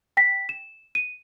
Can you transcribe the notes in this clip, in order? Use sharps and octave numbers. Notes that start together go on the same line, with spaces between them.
G5 A#6 B6
E7
D#7